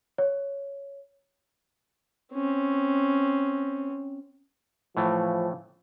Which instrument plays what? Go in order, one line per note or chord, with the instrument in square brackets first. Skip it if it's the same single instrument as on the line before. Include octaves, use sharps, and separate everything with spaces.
[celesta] C#5
[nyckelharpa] C4 C#4
[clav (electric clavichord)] A2 E3 A3 [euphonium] F3